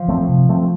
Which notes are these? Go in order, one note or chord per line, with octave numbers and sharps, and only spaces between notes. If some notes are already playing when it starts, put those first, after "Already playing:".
Already playing: F3
F#3 A3 C4
C3
F#3 A3 C4